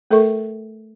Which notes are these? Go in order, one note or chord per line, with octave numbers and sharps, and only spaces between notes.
A3 A4 A#4 E5 C#6